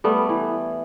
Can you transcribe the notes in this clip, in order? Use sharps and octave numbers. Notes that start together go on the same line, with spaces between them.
G3 A3 B3
E3